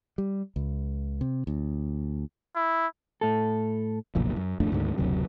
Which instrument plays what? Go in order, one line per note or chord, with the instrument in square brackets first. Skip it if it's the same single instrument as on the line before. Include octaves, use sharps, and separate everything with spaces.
[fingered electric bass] G3
C#2
C3
D2
[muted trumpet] E4
[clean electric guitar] A2 A4
[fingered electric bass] F#1 B1 A#2 F3
F#2
D#1 F2 A3 D4
D2 G#2 D3 D#3
F#1 D2 C3 F#3